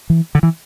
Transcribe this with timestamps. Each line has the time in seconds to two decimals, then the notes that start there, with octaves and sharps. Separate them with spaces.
0.10 E3
0.35 D3
0.43 E3